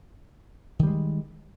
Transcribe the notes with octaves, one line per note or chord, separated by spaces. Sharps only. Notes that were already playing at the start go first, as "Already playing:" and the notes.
D#3 G3 G#3